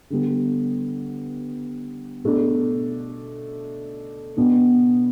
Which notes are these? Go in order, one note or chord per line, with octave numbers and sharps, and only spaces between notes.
D3 G3 B3
B2 A3 D4
B2 B3 D4